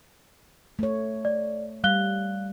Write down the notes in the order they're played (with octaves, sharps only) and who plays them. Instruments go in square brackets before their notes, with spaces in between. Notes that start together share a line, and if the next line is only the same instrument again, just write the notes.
[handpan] A3 C#5
[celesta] D5
[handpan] G3 [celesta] F5 F#6 G7